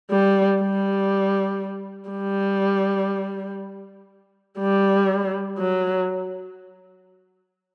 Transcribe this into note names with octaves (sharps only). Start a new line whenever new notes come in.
G3
G3
G3
G3
F#3